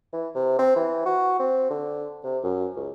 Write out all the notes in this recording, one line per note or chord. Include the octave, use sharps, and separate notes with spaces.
E3
C3
C4
E3
F#4
C4
D3
C3
F#2
C#2